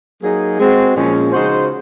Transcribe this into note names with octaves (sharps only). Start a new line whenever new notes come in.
F#3 A#3 D#4 G#4
G#3 C4 F#4
A#2 F3 G#3 C#4
C#3 G#3 D#4 F#4 C5